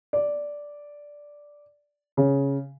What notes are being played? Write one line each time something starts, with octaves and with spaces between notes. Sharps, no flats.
D5
C#3